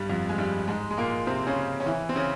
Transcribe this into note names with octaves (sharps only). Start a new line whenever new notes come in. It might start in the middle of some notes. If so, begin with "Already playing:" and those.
Already playing: G2 G3
F2 F3
G#3
G2 G3
G#2 G#3
G#3
A#2 A#3
C3 C4
C#3 C#4
C#4
E3 E4
C4
C#3 C#4